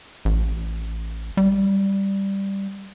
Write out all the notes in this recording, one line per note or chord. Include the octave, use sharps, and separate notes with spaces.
A1
G3